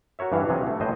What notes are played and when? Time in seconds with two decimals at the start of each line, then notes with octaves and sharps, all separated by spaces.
0.19 F#4 A#4 C#5 E5
0.32 G2 E3 F5
0.49 C3 E3 F#3 C#4 G#4
0.67 A3
0.80 D#2 A2 B4 C5 D#5